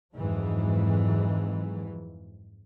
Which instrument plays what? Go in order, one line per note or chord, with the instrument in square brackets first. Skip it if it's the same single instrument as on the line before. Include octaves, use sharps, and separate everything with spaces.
[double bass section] F2 G#2 E3 F#3